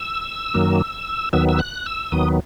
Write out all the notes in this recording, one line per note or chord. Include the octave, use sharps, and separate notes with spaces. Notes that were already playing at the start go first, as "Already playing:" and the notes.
Already playing: E6
F#2 D#3 F#3 A#3
D#2 D#3 F#3 B3 E6
E6
F#6
E6
D#2 D#3 F#3 B3 D#6